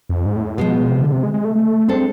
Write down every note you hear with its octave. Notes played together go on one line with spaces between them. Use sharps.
F2
G#2
A2
G#2
A2
B2 F3 G#3 B3
C3
D3
C3
G#3
G#3
A3
A3
G#3 C4 D4 A4